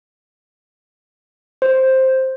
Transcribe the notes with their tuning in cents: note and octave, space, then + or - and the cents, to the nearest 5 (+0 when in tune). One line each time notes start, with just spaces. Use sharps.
C5 +5